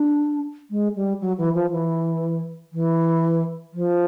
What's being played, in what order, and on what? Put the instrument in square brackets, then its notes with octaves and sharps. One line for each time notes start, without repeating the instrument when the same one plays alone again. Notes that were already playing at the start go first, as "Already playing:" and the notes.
Already playing: [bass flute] D4
G#3
G3
F#3
E3
F3
E3
E3
F3